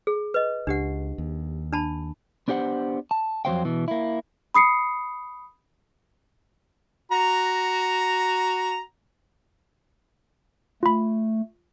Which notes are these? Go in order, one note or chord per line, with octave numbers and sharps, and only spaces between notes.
G#4
B4 D#5
C#2 D4 G4 F#5
D#2
D4 A5 B5
B3 D4 G4 C5 F#5
A5
F2 F#3 A3 C5 F5 G5
B2 E3
A#3 E4
B5 D#6 C7 C#7
F#4 A#5
A3 F4 B5